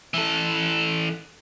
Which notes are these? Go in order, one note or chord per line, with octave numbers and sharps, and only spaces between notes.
E3 A4